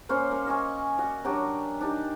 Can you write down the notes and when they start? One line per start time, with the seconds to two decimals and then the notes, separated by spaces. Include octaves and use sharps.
0.09 A#3 C#4 C5
0.31 A#3 E5
0.47 D#5 G#5 C#6
0.98 F#4 D5
1.25 F#3 D4 G4
1.81 D4 D#4 G4